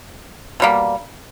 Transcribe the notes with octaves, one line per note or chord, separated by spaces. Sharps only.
B2 G3 A#3